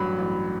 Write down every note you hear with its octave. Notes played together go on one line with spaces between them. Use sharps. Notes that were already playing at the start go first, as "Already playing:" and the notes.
Already playing: A1 G2 F#3 B5
A1